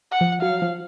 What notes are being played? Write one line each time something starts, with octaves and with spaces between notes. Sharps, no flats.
F#5
F3
F#3 F5
F3